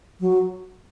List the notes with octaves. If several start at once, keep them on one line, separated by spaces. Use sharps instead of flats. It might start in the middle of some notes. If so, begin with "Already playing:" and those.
F#3